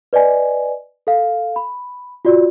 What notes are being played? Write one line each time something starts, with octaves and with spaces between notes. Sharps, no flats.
B4 D5 D#5 G#5
A4 F5
B5
F4 F#4 D5